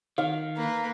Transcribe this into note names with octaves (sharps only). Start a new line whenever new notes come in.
D#3 F5
A#3 B4